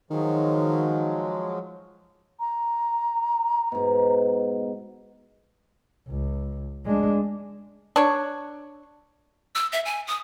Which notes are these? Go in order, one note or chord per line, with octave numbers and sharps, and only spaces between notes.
D#3 F3 F#3 G#3
A#5
G#2 B2
C#2
G#3 D4
D4 C#5
E6
E5
G#5
D#6